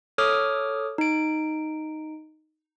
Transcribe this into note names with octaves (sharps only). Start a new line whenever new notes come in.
A4 C#5 D6 D#6 F6
D#4 D7